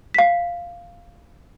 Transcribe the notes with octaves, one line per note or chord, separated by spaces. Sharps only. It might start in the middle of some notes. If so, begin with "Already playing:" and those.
F5 B6